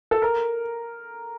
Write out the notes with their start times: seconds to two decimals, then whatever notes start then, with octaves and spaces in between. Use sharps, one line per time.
0.11 A4
0.22 A#4